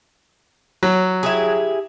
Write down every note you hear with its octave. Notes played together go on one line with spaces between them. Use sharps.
F#3
E4 G4 G#4